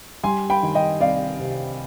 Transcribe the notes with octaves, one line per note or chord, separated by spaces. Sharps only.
G3 G#5 C6
G5 B5
D#3
D#5 G5
C2 D5 F5
C3